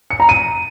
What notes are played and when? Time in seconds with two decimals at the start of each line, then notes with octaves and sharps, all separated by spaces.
0.10 C#7
0.20 A#5
0.29 D#7